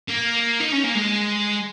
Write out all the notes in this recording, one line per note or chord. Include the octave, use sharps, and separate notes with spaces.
A#3
D#4
C#4
A#3
G#3